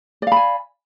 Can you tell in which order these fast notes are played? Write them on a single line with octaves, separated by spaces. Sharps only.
D5 F5 B5 G#5